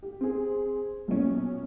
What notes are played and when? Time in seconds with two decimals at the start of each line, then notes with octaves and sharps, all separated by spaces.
0.02 G4
0.21 C4 G#4
1.08 B1 A#2 C#4